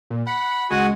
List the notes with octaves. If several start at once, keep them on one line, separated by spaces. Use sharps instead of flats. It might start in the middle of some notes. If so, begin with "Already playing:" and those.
A#2
F#5 B5
C#2 G#3 F#4 F#5 G#5